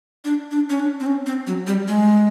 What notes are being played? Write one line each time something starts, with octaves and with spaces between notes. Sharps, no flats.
D4
D4
C#4
D4
C4
C#4
C4
F#3
G3
G#3